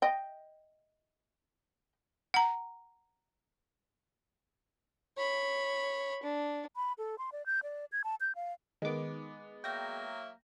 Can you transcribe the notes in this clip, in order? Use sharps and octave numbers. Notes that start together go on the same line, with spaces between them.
D#5 G5
F#5 A#5
C#5 B5
D4
B5
A4
C6
D5
G6
D5
G#6
A5
G6
F5
D#3 G#3 B3 D6
F#3 A#3 E5 G5 A#6